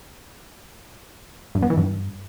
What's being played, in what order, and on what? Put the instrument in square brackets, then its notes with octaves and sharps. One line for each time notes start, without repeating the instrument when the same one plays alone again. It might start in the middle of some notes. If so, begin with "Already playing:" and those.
[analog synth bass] G2
B3
E3
G2